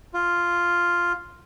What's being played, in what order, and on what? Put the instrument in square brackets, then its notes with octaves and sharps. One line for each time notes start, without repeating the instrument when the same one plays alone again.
[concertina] F4